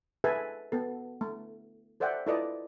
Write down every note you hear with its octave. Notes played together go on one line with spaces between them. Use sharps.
G#4 A4 B4 E5 G#5 A5
B3 A4
A3
A4 C5 D5 E5 F#5 G5
E4 F4 A4 B4 D5 D#5